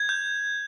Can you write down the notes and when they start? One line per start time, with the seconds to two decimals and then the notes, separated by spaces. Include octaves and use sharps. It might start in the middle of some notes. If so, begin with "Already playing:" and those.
Already playing: G#6
0.09 G6